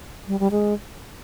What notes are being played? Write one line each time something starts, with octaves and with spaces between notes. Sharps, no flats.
G3
G3
G#3